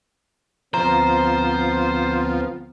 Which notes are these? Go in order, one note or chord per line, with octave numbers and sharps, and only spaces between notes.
D2 F3 B3 C4 C5 A#5